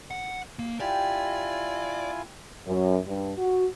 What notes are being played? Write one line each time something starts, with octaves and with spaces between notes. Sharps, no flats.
F#5
A#3
E4 F4 G4 D5 G#5
F#2
G2
F#4